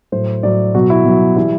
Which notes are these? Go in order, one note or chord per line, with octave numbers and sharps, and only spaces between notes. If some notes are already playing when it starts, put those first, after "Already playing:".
A2 F#3 C5
A2 F#3 D5
B2 F#3 F#4
E4
B2 F#3
E3 G3 E4